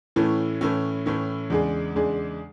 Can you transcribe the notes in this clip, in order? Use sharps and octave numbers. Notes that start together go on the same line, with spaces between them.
A2 E3 A3 C#4 E4
A2 E3 A3 C#4 E4
A2 E3 A3 C#4 E4
E2 C#3 G#3 D4 G#4
E2 C#3 G#3 D4 G#4